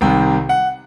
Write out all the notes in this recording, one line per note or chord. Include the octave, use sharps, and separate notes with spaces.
C2 C3 D#3 G5
F#5